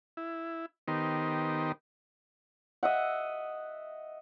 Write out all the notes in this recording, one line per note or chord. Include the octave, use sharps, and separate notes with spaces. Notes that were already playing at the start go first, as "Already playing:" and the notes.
E4
D#3 B3 D#4 G4 A#4 C5
D#5 E5 F#5